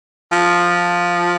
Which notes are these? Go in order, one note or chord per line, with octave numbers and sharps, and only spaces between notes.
F3